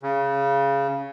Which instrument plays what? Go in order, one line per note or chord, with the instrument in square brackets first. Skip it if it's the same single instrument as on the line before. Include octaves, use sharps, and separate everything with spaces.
[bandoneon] C#3